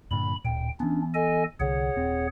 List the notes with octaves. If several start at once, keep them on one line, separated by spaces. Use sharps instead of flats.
G2 A#2 D3 B5
D1 A#2 G5
E3 B3 C#4 D4
A4 D#5 G#5
C2 D3 G#4 C#5 F#5
D#1 C4